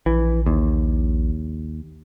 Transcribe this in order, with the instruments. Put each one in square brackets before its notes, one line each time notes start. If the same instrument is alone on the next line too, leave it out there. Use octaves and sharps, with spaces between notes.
[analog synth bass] A#1 [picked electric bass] E3
[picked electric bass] D#2